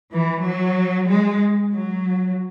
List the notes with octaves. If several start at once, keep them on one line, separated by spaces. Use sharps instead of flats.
E3
F#3
G#3
F#3